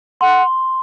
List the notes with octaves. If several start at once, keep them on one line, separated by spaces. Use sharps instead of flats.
F#5 C6